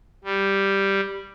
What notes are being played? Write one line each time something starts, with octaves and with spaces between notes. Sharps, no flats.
G3